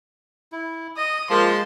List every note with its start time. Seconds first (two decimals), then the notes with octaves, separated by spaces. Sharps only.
0.52 E4
0.97 D#5 D#6
1.30 F3 G#3 A#3 A5 C6